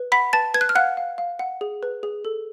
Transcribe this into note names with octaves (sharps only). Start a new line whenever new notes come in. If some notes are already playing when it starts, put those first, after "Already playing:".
Already playing: B4
F#5 B5 B6
B4 A5 A6
B4 G#6
F#6
F6
F5 F#5 F#6
F5
F5
F#5
G#4
B4
G#4
A4